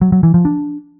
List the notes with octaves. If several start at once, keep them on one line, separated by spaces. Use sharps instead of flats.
F#3
F#3
E3
F3
D4